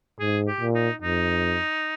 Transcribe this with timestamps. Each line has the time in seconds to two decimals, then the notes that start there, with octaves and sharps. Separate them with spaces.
0.20 G#2 G#4
0.47 G4
0.60 A#2
0.74 D#4
1.01 F2 D#4